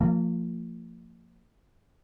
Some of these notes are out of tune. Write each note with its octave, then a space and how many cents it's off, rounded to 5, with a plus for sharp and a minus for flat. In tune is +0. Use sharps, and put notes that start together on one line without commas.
F3 +0 A#3 -35